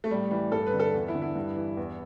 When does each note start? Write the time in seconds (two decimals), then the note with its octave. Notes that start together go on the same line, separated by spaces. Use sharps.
0.04 A3
0.10 A2 G3
0.31 E3 G3
0.52 G2 A4
0.67 B4
0.73 D3
0.80 A4
0.94 E2
1.08 E4
1.15 D3
1.22 E4
1.35 G2
1.56 E3
1.77 E2